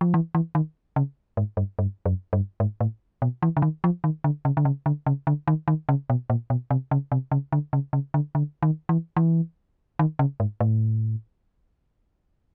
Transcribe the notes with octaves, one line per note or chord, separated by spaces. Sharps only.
F3
E3
E3
D#3
C#3
G#2
G2
G2
F#2
G2
G#2
A2
B2
E3
D3
D#3
F3
D#3
D3
C#3
D3
C#3
D3
C#3
D3
D#3
D#3
C#3
B2
A#2
B2
C3
C#3
C3
C#3
D3
C#3
C#3
D3
D3
D#3
E3
E3
D#3
C#3
G#2
A2